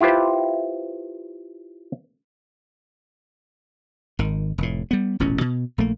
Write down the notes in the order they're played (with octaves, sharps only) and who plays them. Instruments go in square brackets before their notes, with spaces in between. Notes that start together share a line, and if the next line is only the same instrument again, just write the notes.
[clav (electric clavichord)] E4 F4 G4 B4 C5
[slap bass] G#1 D#3
F1 A2
G3 B3
E1 A1 A#2 C#4
B2
A#1 A3 A#3